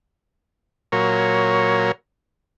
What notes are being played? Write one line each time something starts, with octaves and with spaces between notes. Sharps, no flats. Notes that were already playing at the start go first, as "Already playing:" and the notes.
A#2 F#3 A#4 C#5